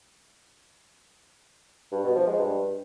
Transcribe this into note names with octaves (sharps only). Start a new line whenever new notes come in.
G2
B2
F3
G#3
G2